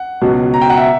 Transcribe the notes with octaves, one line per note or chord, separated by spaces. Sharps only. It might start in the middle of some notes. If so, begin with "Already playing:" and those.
Already playing: F#5
C#2 B2 F#3
A#5
G5
F#5
E5